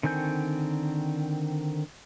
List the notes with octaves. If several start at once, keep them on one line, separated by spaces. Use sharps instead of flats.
D3 D#3 C4 G#5 G6